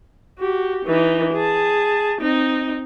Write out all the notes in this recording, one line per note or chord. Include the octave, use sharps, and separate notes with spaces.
F#4 G4
E3 D#4
G#4 A5
C4 D#4